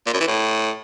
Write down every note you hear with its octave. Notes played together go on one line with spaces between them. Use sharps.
A#2
F#2
E3
A2